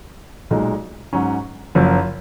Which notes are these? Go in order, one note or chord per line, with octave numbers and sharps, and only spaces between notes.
B1 A#2 G#3 D#4
G#2 F#3 C#4
F#1 F#2 F3